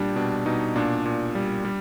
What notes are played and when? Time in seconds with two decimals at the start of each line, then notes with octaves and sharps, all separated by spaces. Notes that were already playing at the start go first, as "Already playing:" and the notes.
Already playing: A#2 G3 D4
0.16 B2 D4
0.46 B2 D#4
0.76 A#2 D4
1.06 A#2
1.35 G3
1.65 G3